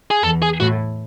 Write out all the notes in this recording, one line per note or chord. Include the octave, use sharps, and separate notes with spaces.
G#4
E2 A4
G#4
A2 F#4